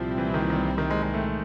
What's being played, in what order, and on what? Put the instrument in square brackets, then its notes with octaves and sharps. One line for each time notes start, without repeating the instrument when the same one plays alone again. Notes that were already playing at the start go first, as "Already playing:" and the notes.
Already playing: [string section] C2 A#2 G3 C4 E4 [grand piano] F3
[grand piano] E3
D#3
D#3
D#3
G#3
G#3
A3